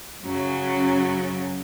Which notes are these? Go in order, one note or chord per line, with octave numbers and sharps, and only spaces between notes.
F#2 C#3 F#3 C#4